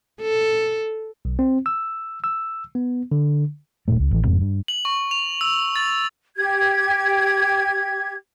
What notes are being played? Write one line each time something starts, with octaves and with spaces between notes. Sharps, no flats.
A4
B1
C4
E6
E6
B3
D3
E1 G2 A#2 A3
C#2
A1 E3
F1 F2 G#2 C3
G2
F#7
C#6
F7
E6
A6
G4 G#6